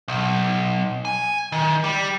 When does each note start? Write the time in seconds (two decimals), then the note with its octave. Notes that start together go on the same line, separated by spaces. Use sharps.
0.08 B1
1.05 G#5
1.52 D#3
1.84 G3